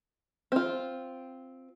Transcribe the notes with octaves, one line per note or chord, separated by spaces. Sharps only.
C4 F4